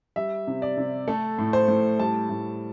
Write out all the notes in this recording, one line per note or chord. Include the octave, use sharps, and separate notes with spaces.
G3 E5
C3
D5
C3
A3 A4
A2
C5
A2
G3 A5
A2